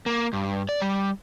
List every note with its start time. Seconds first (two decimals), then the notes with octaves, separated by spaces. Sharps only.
0.06 A#3
0.33 G2
0.69 D5
0.82 G3